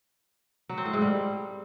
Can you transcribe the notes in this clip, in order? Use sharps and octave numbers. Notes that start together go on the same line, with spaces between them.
F#3
C4
A2
G#2
G3